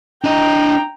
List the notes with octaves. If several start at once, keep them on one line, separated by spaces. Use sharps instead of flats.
D4 D#5 G5 A#5